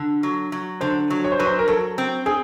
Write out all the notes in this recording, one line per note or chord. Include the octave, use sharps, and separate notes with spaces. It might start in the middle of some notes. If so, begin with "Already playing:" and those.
Already playing: D3
F#3
F#3
D3 C5
F#3
C#5
C5
F#3 B4
C5
A#4
F#3 A4
C4
C4 G#4